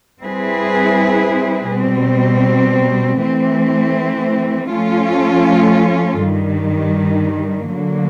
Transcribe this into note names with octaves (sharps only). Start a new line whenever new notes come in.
G3 C4 E4 G#4 B4
B2 G3 C4
E3 A3 C4
F3 A3 C#4 F4 A4
G2 D#3 G3
D3 F#3 A#3